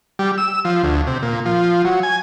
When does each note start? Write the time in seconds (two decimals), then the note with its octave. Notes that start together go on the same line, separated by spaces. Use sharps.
0.19 G3
0.38 E6
0.65 F3
0.83 D2
1.07 C3
1.23 A#2
1.46 F3
1.85 F#3
2.03 G#5